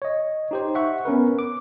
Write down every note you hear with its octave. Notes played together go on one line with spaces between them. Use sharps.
C#5 D#5
D#4 G4 C5
E5 F#5 C#6
B3 C#4 A#4 B4
D6